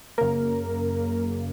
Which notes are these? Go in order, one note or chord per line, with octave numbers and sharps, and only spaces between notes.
F#2 C#3 A#3 A#4